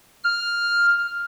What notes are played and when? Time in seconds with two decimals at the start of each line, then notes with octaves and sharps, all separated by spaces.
0.24 F6